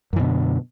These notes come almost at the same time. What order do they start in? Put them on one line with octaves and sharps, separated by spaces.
F#2 E3 B2 D3